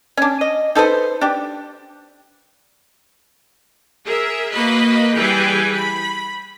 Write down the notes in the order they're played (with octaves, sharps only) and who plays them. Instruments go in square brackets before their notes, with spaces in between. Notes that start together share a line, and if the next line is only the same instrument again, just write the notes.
[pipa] C#4 D4
D#5
D#4 A4 B4 C5
D4 G4
[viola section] G#4 A#4 E5
A#3 F#4 B4 D#5 B5
E3 G3 G#4 B4 G5 G#5
B5